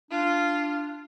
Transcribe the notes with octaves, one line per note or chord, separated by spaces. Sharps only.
D4 F4